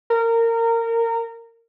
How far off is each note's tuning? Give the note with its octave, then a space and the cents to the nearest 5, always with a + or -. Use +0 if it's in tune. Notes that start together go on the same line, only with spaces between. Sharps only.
A#4 -20